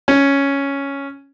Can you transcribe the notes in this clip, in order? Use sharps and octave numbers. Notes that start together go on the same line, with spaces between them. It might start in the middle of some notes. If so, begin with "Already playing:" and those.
C#4